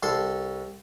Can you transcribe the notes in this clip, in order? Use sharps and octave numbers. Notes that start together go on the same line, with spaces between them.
C2 A4 C6